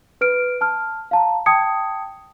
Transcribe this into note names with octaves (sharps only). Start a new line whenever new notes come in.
B4 F6 D7
A5 F6
F5 A5 A#5
G5 A5 D#6 G#6 C#7